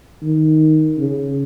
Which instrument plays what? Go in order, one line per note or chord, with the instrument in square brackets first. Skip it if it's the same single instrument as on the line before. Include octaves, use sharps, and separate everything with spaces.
[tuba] D#3
C#3